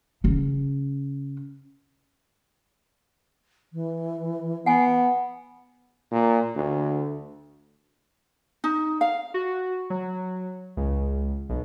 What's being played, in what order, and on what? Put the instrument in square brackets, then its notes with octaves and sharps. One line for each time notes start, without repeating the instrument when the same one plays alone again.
[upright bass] C#3 C#4
[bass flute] E3
[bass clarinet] B3 [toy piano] F#5 G#5
[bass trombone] A#2
D2
[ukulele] D#4
F5
[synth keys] F#4
F#3
C#2
B1